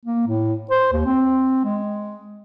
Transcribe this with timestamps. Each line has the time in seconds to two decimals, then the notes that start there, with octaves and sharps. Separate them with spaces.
0.05 A#3
0.27 A2
0.71 C5
0.93 D#2
1.06 C4
1.65 G#3